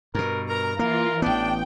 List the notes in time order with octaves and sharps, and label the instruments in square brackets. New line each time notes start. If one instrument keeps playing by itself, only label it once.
[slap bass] G2 B2 [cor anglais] A#4
[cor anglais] A#4 [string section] A#5
[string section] E3 F4 [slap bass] A#3 [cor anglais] A#4
[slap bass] A1 B3 [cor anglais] D4 [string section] G5